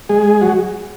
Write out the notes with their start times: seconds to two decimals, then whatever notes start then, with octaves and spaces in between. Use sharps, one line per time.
0.09 G#3 G#4
0.41 F#3 F#4